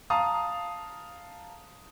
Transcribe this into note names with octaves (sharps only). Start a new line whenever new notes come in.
F5 A5 A#5 D#6